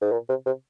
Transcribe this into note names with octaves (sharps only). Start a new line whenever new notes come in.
G#2
A#2
C3
C3